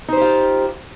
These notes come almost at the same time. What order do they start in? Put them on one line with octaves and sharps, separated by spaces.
D#4 C5 G4 F4